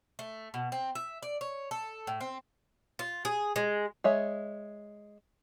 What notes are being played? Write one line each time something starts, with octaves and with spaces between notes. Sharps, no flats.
A3
B2
C4
E5
D5
C#5
A4
A2
C4
F4
G#4
G#3
G#3 C#5 E5